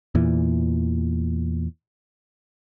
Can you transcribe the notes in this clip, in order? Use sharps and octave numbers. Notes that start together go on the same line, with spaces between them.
E2 A#2 E3